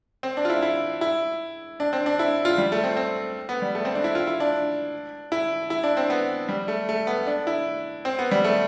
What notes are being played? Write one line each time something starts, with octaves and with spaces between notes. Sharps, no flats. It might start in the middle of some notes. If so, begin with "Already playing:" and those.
C4
D4
F4
E4
E4
E4
D4
C4
D4
E4
F4
G3
A3
C4
C4
B3
G3
A3
C4
D4
E4
F4
E4
D4
E4
E4
D4
C4
B3
G3
A3
A3
B3
D4
E4
C4
B3
G3
A3